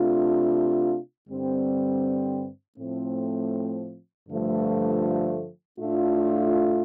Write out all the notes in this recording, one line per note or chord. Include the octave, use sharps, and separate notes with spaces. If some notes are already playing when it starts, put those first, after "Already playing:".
Already playing: C3 A3 D4 F4
G2 D3 G3 C4
A2 F3 A3 C4
G2 D3 F3 A3 F4
A2 A3 D4 F4